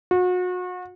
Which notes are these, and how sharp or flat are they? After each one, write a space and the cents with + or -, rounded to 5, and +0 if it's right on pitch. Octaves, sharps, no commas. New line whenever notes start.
F#4 -35